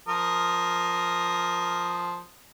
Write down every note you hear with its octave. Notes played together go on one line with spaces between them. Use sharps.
F3 A#4 D#6